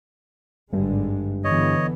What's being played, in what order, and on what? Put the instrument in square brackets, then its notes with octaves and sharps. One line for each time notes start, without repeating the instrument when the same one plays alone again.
[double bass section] G#1 D3 G#3 [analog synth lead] G2
[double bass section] D3 E3 B3 [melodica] C#5 D#5